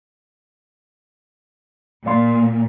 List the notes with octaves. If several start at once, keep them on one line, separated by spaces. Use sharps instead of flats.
A#2 D5 F5 C6